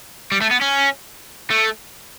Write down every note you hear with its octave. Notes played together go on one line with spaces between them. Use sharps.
G3
A3
B3
C#4
A3